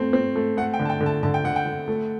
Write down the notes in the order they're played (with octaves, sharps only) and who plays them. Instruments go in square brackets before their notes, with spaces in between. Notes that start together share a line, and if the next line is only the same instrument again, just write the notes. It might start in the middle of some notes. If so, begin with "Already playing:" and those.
Already playing: [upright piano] A3 C4
C4
A3
[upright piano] A3 [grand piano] F#5
[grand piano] G5
[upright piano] D3
[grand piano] A5
G5
[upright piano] D3
[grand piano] A5
[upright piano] D3 [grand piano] A5
[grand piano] G5
[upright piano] D3 [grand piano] F#5
[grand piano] G5
[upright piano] D3
A3